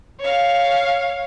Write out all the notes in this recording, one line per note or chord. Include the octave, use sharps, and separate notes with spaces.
C#5 F5